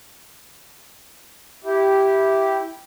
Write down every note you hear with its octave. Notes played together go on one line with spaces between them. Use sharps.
E4 G4